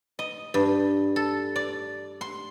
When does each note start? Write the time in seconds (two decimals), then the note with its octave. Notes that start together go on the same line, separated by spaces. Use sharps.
0.19 D#5
0.54 G2
1.16 A4
1.56 D5
2.21 C6